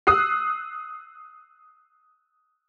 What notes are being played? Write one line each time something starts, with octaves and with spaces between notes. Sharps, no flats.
D#6 E6 F#6 C7